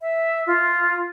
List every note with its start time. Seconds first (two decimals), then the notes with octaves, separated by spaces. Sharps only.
0.01 E5
0.47 F4